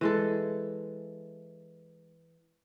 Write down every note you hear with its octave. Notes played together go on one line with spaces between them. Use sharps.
E3 G#3 A4